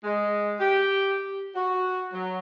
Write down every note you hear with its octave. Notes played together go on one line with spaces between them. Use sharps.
G#3
G4
F#4
F#3